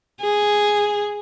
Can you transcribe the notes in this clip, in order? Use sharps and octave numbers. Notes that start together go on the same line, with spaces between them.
G#4